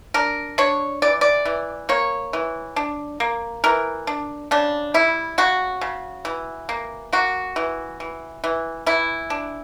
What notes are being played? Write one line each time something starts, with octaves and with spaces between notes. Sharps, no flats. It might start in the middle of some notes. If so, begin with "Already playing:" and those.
D4 A#4
D4 C#5
E3 D5
D5
E3
A#3 C#5
E3
D4
A#3
E3 A#4
D4
C#3 D4
G3 E4
C#3 F#4
C#3
E3
A#3
A#3 F#4
E3
E3
E3
E3 E4
D4